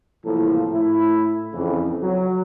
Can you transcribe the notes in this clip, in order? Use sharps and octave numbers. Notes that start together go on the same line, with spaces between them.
C2 A2 E3 F3 A#3 A4
A2 E4
F2 C#3 E3
F#3